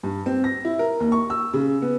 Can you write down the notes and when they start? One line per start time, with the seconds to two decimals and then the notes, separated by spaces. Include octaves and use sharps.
0.03 G2
0.26 C4
0.44 A#6
0.65 E4
0.79 A#4
1.00 D#2
1.12 C#6
1.30 E6
1.54 C#3
1.82 B3